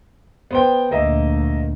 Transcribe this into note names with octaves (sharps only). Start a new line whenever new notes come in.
B3 C5 G5
D2 A#2 A#3 D#5 E5